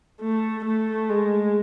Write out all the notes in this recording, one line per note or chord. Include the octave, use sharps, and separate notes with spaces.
A3
A3
G#3